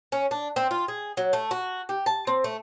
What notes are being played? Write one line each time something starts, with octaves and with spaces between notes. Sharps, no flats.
C#4
D4
C4
F4
G#4
F#3
A3
F#4
G4
A5
C4
A3